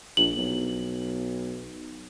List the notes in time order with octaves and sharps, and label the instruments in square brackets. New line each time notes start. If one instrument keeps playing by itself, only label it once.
[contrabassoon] A#1 [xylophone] F#7
[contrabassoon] B1